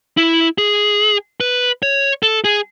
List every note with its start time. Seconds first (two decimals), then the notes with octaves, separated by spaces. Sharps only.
0.17 E4
0.58 G#4
1.40 B4
1.83 C#5
2.23 A4
2.44 G#4